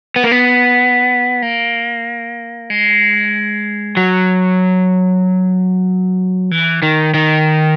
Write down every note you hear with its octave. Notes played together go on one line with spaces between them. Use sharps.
B3
A#3
B3
A#3
G#3
F#3
E3
D#3
D#3